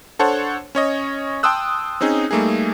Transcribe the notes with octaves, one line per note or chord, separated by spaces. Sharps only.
D4 A4 C5 C#5 F#5
C#4 C#5 D#5
G5 A5 C6 D#6 E6 F#6
C4 C#4 D#4 G#4
G3 A3 A#3 D#4 G#4